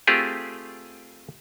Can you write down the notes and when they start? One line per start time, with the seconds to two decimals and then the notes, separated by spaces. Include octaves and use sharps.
0.07 A3 C4 F4 G4 G#4